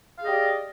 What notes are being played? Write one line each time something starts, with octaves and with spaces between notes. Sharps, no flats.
G4 G#4 D5 D#5 F5